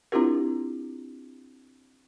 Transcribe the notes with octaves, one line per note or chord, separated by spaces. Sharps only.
C4 D4 E4 F4 G4 A#4